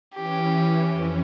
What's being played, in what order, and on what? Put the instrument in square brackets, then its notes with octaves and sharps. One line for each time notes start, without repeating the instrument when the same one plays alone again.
[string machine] E3 C#4 [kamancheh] G4
[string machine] F2 E3 C#4